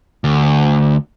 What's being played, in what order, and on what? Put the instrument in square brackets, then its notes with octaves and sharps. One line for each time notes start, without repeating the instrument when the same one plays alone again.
[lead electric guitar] D2